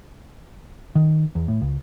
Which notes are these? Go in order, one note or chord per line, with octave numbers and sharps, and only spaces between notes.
D#3
E2
A2
C#2